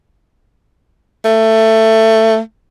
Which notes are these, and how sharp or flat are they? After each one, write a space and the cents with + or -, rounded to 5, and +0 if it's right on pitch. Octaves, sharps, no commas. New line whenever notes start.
A3 +15